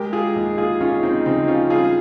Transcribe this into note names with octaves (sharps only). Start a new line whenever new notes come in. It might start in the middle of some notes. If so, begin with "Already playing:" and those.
Already playing: G#3 G4 A#4
F4 G#4
D#2
F4 G#4
D#2 C#4 F4
C4 D#4
C#3 C4 D#4
C#4 F4
G3 F4 G#4